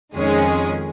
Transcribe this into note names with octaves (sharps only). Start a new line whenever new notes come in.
F2 D#3 G#3 C#4 G#4